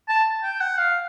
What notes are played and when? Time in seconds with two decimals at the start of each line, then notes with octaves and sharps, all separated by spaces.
0.08 A5
0.43 G5
0.61 F#5
0.78 F5